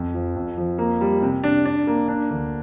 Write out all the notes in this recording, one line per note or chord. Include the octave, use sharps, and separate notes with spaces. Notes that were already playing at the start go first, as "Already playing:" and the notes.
Already playing: F2
F3
F2
F3
A#3
G3
C3
D4
D4
A#3
D4
D2